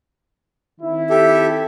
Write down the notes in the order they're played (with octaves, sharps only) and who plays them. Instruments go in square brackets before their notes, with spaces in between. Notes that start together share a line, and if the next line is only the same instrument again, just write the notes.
[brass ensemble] D#3 C4 E4
[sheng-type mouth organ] G4 A4 E5